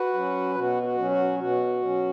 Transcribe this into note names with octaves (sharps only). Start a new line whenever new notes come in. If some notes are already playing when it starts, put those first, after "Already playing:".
Already playing: F#4 B4
F#3 C#4
B2 F#4
F#4
F#3 C#4
F#4
B2 F#4
F#3 C#4